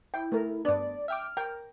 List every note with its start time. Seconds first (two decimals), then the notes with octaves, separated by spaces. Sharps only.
0.14 E4 G5
0.32 A3 A#4
0.65 G2 B3 D4 D5
1.08 E5 G5 D6 F6
1.37 A#4 G5